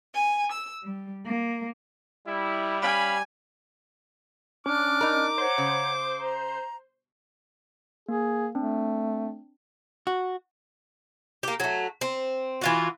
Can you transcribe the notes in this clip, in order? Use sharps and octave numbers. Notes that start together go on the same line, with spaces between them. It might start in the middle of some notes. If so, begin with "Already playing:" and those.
G#5
E6
G3
A#3
G3 E4
C#4 F5 G#5 B5
C#4 D4 D6 F6 F#6
D#4 A#4
C5 C#5 F#5 A#5
C#3
A#5
A#3 G#4
A3 C4 D4
F#4
A#3 G4
F#3 A3
C4
E3 F4 F#4